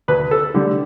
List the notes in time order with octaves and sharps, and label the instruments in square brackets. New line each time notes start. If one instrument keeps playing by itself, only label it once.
[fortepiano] D2 B4
A4
D3 G3